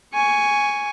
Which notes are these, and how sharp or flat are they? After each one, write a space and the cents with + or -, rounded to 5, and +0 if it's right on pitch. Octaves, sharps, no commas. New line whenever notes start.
G#5 +0 C#6 +10